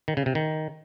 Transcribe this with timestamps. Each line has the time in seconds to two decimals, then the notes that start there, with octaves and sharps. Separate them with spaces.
0.08 D#3
0.17 C#3
0.26 C3
0.35 D#3